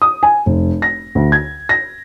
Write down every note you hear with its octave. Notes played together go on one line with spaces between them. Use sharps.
D#6
G#5
F1
A#6
D2
G#6
A#6